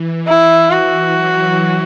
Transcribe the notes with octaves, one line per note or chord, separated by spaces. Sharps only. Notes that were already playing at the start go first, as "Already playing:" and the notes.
Already playing: E3
E4
E3 F#4
F#3